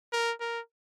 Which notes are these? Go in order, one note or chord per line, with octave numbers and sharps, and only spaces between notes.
A#4
A#4